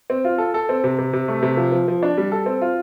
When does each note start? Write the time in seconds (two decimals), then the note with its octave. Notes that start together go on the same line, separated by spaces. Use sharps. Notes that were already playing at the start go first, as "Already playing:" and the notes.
0.10 C4
0.25 F4
0.38 A4
0.54 A4
0.69 C4
0.84 C3
0.98 C3
1.13 C3
1.28 A3
1.43 C3
1.57 F3
1.72 F3
1.88 F3
2.03 D4
2.18 G3
2.32 A4
2.46 C4
2.61 F4